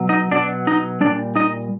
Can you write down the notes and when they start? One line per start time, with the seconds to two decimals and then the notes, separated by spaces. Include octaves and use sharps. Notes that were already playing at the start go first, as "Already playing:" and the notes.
Already playing: B2 F#3
0.09 D#4 D#5
0.31 B2 F#3 D4 D5
0.67 D#4 D#5
1.00 A#2 G3 D4 D5
1.35 D#4 D#5